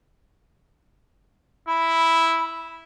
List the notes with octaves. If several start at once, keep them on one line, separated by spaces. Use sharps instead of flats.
E4 B5